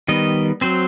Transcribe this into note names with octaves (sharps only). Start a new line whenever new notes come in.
D#3 G3 B3 D#5
F#3 C4 C5